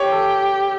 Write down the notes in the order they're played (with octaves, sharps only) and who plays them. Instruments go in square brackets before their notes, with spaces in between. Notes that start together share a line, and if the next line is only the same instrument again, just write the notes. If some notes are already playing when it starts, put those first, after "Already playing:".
Already playing: [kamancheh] G4 [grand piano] C#5
[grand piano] A4